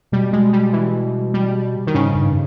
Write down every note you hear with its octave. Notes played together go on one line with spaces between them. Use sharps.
B2 G3
G#3
G3
E3
G3
D#3
G#2 C#3
G2